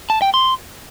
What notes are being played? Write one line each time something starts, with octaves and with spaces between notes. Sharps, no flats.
A5
G5
C6